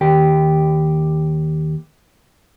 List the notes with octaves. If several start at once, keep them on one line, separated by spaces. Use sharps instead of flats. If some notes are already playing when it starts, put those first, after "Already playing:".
D#2 G4